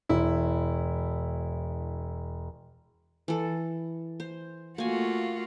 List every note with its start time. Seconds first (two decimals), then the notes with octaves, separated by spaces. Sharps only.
0.09 E1 E4
3.28 E3 A4
4.20 C5
4.78 A3 A#3 F4 F#4 G#5